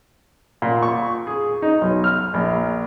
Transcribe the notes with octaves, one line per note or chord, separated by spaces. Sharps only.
A#2
C#6
G#4
D#4
B1
F6
A#1